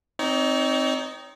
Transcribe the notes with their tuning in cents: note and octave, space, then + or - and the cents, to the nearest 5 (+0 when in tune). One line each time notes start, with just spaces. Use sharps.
C4 +0 D#4 +0 C#5 +40